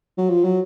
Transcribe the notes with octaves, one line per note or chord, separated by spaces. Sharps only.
F#3
F3
F#3